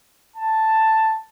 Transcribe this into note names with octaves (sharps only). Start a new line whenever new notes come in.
A5